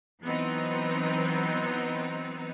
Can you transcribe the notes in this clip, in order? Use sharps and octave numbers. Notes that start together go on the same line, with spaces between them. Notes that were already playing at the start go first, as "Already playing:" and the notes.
E3 F#3 B3 C4 D#4